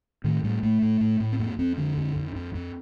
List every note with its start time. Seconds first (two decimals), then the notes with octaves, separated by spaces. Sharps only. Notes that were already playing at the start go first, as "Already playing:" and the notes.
0.24 A2 D#3
0.44 A2 G3
0.63 A2 A3
0.82 A2
1.01 A2
1.20 A2
1.32 C4
1.39 F2 A#3
1.59 F2 C4
1.78 D3 D4
1.97 F2
2.16 F2
2.35 F2
2.55 F2